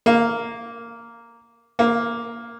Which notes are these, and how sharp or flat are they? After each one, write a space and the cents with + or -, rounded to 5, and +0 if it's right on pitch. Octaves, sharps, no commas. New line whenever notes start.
A#3 -5
A#3 +0